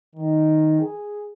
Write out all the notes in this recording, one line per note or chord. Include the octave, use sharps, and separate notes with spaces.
D#3
G#4